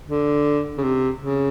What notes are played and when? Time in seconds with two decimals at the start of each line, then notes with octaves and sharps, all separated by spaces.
0.08 D3
0.78 C#3
0.83 C3
1.21 C#3